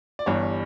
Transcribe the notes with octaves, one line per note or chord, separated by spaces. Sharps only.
D5
G1 G2 E3 C#5